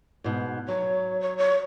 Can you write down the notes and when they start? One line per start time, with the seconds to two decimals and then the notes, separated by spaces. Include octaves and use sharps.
0.24 G#2 B2
0.68 F#3 C#5
1.20 C#5
1.37 C#5